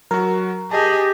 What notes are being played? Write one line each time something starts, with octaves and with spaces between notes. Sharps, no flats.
F#3 F#4 A#4
G4 G#4 D#5 A5 D#6